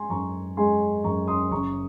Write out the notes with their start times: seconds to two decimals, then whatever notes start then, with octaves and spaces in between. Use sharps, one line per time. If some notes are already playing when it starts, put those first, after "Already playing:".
Already playing: G#3 G#5 C6
0.10 F#2 A#5 C#6
0.57 G#3 G#5 C6
1.04 F#2 A#5 C#6
1.28 C6 D#6
1.51 F#1 A#5 C#6